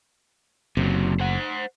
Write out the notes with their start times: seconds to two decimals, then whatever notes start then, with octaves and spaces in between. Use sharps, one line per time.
0.77 F#1 C3 F#3
1.20 C5 F#5